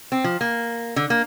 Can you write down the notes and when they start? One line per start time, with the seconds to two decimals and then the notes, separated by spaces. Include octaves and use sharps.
0.12 C4
0.24 F3
0.41 A#3
0.96 D3
1.10 A#3